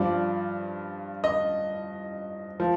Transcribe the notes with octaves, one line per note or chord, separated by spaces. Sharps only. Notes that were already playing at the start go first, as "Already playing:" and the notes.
Already playing: G2 F3 D5
D#5
F3